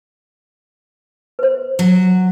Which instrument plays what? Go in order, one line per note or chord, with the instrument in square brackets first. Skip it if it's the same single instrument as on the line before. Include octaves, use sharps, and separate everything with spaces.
[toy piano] B4 C5
[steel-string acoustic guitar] F#3